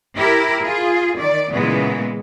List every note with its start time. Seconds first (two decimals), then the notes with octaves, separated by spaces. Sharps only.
0.16 E4 G4 A#4
0.63 F4 G#4
1.17 D#3 D5
1.52 A#2 C#3 E3 G#3 B3